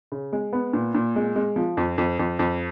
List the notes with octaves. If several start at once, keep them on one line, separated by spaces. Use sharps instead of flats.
C#3
G#3
B3
A#2
A#2
G#3
G#3
F3
F2
F2
F2
F2